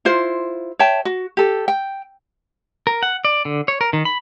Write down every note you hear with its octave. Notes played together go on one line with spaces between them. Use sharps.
E4 F4 C5
C#5 E5 G5 A5
F#4
G4 A4
G5
A#4
F#5
D5
D3
C#5
A#4
D#3
B5